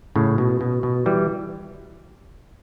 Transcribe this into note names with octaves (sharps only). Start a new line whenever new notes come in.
A2 C#3
B2
B2
B2
E3 G3